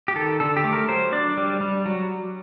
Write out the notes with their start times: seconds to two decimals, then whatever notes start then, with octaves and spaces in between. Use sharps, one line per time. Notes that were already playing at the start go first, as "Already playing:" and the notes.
0.08 G4
0.15 D#3 A4
0.40 D3 A4
0.57 G4
0.64 A3
0.73 A#4
0.88 F#3 C5
1.12 D4 D5
1.37 G3
1.61 G3
1.86 F#3